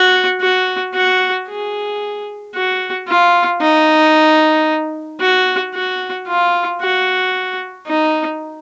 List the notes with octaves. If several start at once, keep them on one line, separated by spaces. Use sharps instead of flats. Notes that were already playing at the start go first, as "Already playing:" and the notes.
Already playing: F#4
F#4
F#4
G#4
F#4
F4
D#4
F#4
F#4
F4
F#4
D#4